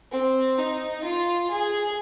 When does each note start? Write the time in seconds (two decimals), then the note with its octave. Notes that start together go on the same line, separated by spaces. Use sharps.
0.11 C4
0.58 D#4
1.03 F4
1.51 G#4